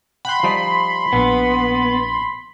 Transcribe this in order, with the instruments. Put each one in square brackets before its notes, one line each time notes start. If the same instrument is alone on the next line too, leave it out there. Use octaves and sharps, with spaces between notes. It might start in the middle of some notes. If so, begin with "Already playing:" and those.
[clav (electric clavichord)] F#5 G5 [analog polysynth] B5 C6
[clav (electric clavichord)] F3 G3 D#4
[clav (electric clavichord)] A#1 [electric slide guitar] B3